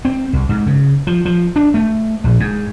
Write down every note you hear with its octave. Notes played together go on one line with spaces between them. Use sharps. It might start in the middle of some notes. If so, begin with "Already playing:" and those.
C4
C2
G#2
C#3
F3
F3
D4
A3
A#1
G#2